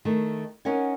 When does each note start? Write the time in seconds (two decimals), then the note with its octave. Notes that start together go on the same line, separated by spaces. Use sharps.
0.05 D#3 A3
0.65 C#4 D#4 A#4 F#5 G#5